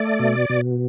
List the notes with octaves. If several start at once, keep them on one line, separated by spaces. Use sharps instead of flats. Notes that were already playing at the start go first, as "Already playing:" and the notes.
Already playing: A3 D5
B2
B2